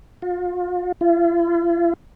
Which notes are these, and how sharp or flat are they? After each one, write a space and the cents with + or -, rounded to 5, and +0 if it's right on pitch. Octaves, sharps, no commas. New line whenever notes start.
F4 +35
F4 -45